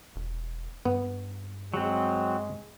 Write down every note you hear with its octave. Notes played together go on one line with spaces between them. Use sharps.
E1
G2 B3
F#3 G#3 C4